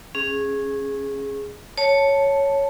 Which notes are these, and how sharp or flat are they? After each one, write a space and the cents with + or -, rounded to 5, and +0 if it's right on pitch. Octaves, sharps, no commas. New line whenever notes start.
C#4 -20 G#4 +0
C#5 +0 A5 +0